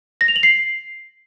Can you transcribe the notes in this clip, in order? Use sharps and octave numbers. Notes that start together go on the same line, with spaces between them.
A#6
F7
F#7
C7